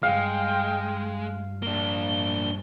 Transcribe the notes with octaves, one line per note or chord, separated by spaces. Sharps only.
G2 G#3 F5 G5
A#3 D4 G7